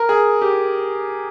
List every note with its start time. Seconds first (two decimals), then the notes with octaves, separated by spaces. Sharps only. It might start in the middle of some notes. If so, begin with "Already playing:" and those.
Already playing: A#4
0.09 G#4
0.42 G4